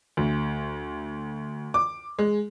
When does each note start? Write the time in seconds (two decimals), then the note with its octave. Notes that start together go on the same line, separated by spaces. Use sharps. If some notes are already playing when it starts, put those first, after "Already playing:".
0.17 D2
1.74 D6
2.19 G#3